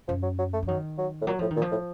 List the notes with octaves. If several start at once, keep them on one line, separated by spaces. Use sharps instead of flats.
F#2 F3
F#3
F#3
A3
F3
D#3 F#3
F#3
A2
A#2 F#3
A2 F3
D#3
A#2
F3
A2